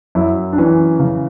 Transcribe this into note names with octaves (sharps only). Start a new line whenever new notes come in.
F#2 E4
D4
E3 C#4
C#3